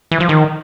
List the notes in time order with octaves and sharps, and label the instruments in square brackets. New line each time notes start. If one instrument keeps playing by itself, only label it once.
[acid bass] E3
F3
D#3